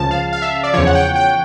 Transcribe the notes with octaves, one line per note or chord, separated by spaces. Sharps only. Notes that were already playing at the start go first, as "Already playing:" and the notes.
Already playing: C#2 C#3 F3 A5
F5
F5
E5
D5
E2 C#3 F3 C#5
F#5
G5
G5